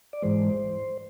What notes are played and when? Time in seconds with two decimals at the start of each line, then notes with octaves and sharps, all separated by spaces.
0.13 D5
0.22 G#2 E3 G#3 C5